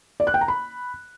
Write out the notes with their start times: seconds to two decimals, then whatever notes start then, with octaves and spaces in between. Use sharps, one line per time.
0.20 D5
0.27 F#6
0.34 G5
0.41 A#5
0.48 B5